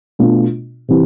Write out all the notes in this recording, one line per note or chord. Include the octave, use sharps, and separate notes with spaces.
B2 A3 D4 F4
C3 E3